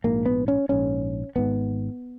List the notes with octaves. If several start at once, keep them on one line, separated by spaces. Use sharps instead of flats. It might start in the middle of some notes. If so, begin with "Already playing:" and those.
A#1 G#2 A#3
B3
C#4
A#1 G#2 C#4
G#1 G#2 B3